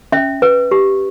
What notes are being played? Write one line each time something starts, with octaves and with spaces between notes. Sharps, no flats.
C#4 E5
B4
G4